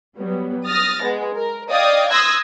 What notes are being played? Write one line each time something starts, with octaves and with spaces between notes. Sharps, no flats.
F#3 G3 B3
D#6 F6 A6 A#6
G#3 B3
A#4
D5 D#5 F5 G5 D#6 G#6
C6 D#6 E6 F#6 G#6 A#6